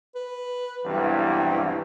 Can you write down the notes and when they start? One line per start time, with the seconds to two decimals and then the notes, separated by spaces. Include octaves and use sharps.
0.15 B4
0.85 B1 G2 C3 E3